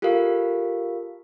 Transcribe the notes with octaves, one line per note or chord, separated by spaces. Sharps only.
F4 G4 A4 A#4 F5